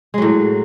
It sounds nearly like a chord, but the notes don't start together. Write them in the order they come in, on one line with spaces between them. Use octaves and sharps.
G#3 F#3 A2